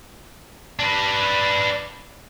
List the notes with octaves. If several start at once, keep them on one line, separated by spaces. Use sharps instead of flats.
D4 B4